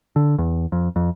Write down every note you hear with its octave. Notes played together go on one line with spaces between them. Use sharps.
D3
E2
F2
F2